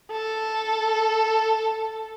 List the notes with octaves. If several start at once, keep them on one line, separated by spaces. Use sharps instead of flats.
A4